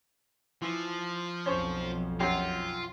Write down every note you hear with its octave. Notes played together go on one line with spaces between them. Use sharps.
E3 F3
B1 F2 C#4 C5 C#5
F#2 F4 G4